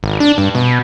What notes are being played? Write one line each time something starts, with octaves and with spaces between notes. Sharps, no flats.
G#1
D4
G2
B2